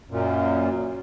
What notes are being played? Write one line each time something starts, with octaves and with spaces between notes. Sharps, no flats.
F#2 A#2